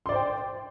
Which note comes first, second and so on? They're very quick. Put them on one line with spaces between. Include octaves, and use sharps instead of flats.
C6 D5 C5 G5